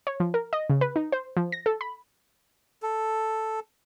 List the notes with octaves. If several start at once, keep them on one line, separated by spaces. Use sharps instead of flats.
C#5
F3
A#4
D#5
C#3
B4
D#4
C5
F3
A#6
A4
B5
A4